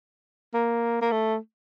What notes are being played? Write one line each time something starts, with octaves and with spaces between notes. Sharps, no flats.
A#3
A#3
A3